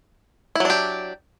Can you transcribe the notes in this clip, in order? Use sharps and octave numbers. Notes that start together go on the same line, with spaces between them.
F#3 D4 E4 G4